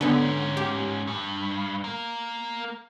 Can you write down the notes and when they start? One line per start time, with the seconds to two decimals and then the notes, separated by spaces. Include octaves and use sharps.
0.01 G#2 D3 B3 C#4
0.57 G4
1.07 G2
1.84 A#3 A#4